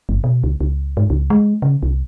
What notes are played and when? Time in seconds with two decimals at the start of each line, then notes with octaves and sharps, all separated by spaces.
0.09 G1
0.24 B2
0.44 C#2
0.61 C#2
0.97 G#2
1.10 C#2
1.30 G#3
1.62 C#3
1.83 C2